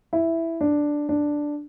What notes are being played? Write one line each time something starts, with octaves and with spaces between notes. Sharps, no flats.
E4
D4
D4